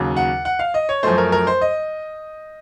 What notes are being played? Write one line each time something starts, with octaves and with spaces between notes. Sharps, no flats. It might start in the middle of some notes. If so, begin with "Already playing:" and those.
Already playing: D#2 C#3 F#3
F#5
F#5
F5
D#5
C#5
F#2 F3 A3 C5
A#4
A#4
C5
D#5